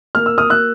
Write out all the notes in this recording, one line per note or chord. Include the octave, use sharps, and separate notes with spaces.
A#3 F6
E6
D#6 F6
A#3 E6 F#6